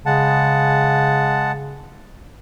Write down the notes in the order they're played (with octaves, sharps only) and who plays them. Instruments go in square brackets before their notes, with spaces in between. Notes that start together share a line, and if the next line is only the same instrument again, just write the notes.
[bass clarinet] C#3 [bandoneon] G#3 F#5 A5